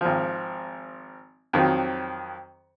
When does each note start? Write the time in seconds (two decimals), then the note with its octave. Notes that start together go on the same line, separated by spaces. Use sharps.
0.01 G#1 F3
1.53 F2 D#3 F#3 C4